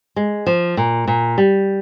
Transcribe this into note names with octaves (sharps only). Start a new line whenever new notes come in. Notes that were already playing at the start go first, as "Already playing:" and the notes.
G#3
F3
A#2
A#2
G3